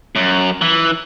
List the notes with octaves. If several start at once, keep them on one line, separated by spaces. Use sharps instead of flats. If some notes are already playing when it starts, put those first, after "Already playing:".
F#2
E3